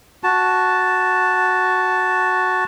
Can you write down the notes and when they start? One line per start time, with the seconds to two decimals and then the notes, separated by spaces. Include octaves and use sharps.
0.24 F#4 A5